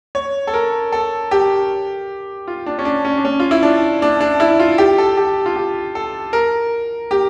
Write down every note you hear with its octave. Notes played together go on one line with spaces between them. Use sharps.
C#5
A4
A#4
A4
G4
F4
D4
C#4
D4
C#4
D4
C#4
F4
E4
D4
D4
D4
E4
F4
G4
A4
G4
F4
G4
A4
A#4
G4